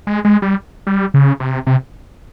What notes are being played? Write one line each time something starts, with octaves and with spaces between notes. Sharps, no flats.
G#3
G#3
G3
G3
C#3
C3
C3